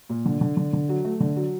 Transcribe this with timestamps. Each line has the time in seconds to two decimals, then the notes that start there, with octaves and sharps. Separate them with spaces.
0.09 A#2
0.25 D3
0.41 D3
0.57 D3
0.73 D3
0.89 F#3
1.05 A3
1.20 D3
1.36 F#3